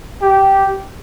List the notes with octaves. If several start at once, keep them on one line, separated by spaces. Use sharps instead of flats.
G4